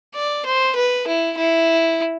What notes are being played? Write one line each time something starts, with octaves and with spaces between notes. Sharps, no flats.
D5
C5
B4
E4
E4